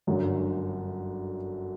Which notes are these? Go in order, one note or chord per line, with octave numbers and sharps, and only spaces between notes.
G1 F#2 D3 F#3